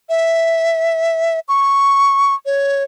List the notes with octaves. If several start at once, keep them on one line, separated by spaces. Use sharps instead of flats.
E5
C#6
C#5